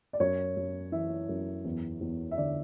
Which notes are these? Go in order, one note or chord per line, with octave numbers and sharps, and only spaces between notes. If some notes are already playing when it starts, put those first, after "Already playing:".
D5
F#2 C#5
F#2
E3 E5
F#2
E2
E2
E5
D3 D5